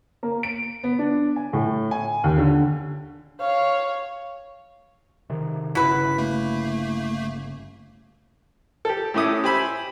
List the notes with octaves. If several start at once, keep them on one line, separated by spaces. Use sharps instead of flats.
A#3
D7
B3
D4
G#5
A2
G#5
D#2
D3
C#5 F5
C3 D#3
G1 C#3 E4 F#4 B4 B6
A3 A#3
G4 A4
A2 A3 C#4 E4 D6 D#6
G4 C5 G#5 B5 E6